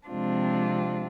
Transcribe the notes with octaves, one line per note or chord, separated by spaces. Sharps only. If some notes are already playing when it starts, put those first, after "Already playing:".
C3 F3 G#3 C4 D4 F4